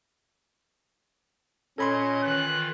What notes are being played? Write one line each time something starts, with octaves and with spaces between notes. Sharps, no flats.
A#2 C#4 A4 D#5 B5 C6 G#6
D#3 E3 F4 F#6